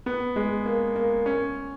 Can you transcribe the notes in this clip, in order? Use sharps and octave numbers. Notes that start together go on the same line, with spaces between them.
B3
G#3
A#3
A#3
C#4